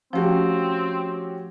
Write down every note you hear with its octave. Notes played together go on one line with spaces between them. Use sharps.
F3 A3 C4 C#4 F#4 G4